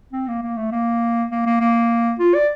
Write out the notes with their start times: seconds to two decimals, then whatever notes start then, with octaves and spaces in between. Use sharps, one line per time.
0.13 C4
0.28 A#3
0.43 A#3
0.56 A3
0.72 A#3
1.31 A#3
1.46 A#3
1.60 A#3
2.19 F4
2.34 D5